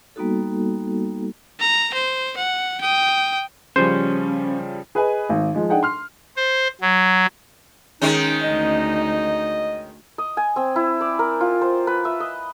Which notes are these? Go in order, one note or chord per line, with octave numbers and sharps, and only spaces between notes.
G3 A#3 B3 D#4 F#4 A4
A#5
C5
F#5
G5 D#6
C#3 F3 G3 C#4 C5
G#4 B4 D#5 G#5
G#1
F3 G#3
D4 D#4 G#4 F#5 G5
C6 F6
C5
F#3
D#3 G#3 C#4 D#4
D2 D#4 D#5
D#5
G#5
C4
E4
D5
A#4
F4
C5
B4
E5
D#5